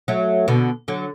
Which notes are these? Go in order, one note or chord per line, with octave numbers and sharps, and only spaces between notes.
F#3 A3
B2 D3
D3 F#3